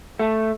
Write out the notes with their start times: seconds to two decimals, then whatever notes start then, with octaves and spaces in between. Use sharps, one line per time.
0.20 A3